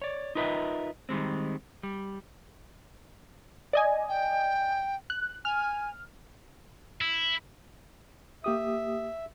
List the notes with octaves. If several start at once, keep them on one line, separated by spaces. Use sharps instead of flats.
C#5 D5
D#4 F4 A#4 B4 D#5 E5
D#3 G3 G#3 C4
G3
D5 D#5 G#5
G5
F#6
G#5 F6
E4
A#3 G4 E5 D#6